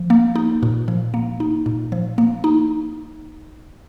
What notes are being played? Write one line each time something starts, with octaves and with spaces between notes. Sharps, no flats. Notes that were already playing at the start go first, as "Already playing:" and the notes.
Already playing: F3
A#3
D#4
A#2
F3
A#3
D#4
A#2
F3
A#3
D#4